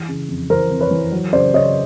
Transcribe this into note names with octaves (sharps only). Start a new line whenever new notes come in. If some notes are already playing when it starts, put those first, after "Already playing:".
Already playing: E3
C#3
F2
E3 A#4 C5
F2
B4 C#5
E3
F#3
C#3 C5 D5
C#3 C#5 D#5